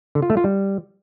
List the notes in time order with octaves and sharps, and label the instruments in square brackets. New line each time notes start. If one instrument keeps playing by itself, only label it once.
[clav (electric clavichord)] D3
F4
A3
F4
G3